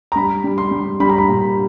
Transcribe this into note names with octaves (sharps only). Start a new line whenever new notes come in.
A#5
G3 B5
G3
C6
G3
G3 B5
A#5
B5
A#2